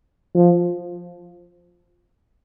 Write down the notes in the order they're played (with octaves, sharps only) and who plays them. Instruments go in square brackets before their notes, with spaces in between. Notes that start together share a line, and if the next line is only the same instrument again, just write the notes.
[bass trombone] F3